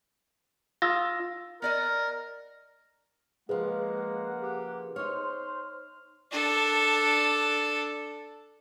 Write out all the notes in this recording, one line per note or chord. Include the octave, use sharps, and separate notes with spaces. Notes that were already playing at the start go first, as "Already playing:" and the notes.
F4 D#6 E6 A#6
B3 A#4 D5 D#5
C#3 F3 G#3 A#3 G#4 B4 F#5
G4
D#4 C5 C#5 F6
D4 A4